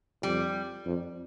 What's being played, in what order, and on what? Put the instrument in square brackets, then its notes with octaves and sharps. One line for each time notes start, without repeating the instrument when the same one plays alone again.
[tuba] F2 [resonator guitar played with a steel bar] G3
[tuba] F2